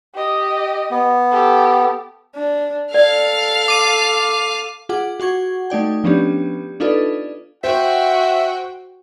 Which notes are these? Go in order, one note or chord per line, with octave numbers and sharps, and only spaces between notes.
G4 D#5
B3
G4 A4
D4
A4 D5 F5 F6
D6 D#7
F4 G#4 F#5 D6
F#4 F#5 C#6 G#6
A3 D#4 D5 G5
F3 B3 C#4 D4 G4
D4 D#4 F4 A4 B4 D5
F#4 C5 E5 F#5 G5